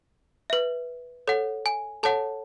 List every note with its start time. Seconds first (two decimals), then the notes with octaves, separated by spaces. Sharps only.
0.50 B4 E5
1.27 A4 C#5 F#5
1.66 G#5
2.03 A4 C#5 F#5 A5